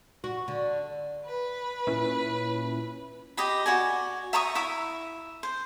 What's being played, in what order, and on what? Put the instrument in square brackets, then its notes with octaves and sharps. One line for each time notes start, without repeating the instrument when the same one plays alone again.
[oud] F#4
D3
[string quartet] B4
[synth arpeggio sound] A#2 C#4 E4
[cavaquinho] G4 D#5 B5
F#4 D5 G#5
E5 A#5 C#6 D#6
E4 E5 B5
C5